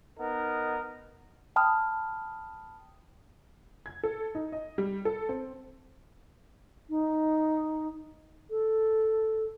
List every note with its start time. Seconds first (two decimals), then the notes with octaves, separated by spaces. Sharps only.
0.19 B3 D#4 A#4
1.56 G5 A5 B5 D#6 F6
3.86 G#6
4.03 A4
4.35 D#4
4.52 D#5
4.78 G3
5.05 A4
5.29 C4
6.89 D#4
8.50 A4